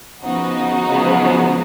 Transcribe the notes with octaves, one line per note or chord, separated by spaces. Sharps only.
C#3 F3 B3 D#4 F#4
C#3 F3 G#3 B3